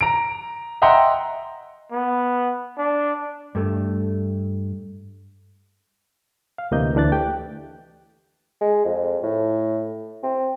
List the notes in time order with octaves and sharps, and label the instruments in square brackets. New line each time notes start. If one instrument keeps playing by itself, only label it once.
[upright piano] A#5 D7
D#5 E5 F#5 G5 A#5 C6
[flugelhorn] B3
D4
[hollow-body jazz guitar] G2 A3
[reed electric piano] F5
D2 C3 E3 A#3 D#5 G6
D2 E3 D4 F#6 A6
A3 G4 G5
[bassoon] G#3
F2
A2
C4